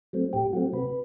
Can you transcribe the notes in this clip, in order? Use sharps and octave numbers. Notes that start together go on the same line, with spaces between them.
F#3 A3 C4
A2 G4
F#3 A3 C4 F#4
C3 B4